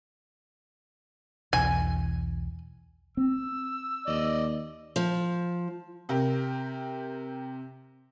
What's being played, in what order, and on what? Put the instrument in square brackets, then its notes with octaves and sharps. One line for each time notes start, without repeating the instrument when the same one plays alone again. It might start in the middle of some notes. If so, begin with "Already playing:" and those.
[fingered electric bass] B1 E2 [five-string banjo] G#5
[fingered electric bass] C4 [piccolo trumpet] E6
[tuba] D#2 [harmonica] D5 D#5
[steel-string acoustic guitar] F3
[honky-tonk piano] C3 G4 A#4